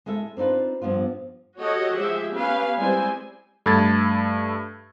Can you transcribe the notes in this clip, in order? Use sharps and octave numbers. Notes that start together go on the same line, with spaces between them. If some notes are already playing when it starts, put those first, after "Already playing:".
G#3 E4 A4 E5
C4 D4 D#4 F4 B4
G2 F3 B3 F4
F#4 G4 A4 C#5 D#5 F#5
F3 G#3 G4 G#4 E5
B3 C#4 G4 B4 F5 G#5
G3 G#3 C4 E4 C5 G#5
G2 A3 A4 B5 G#6 A6